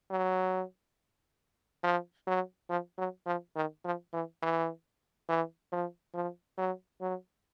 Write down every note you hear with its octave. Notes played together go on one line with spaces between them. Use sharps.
F#3
F3
F#3
F3
F#3
F3
D#3
F3
E3
E3
E3
F3
F3
F#3
F#3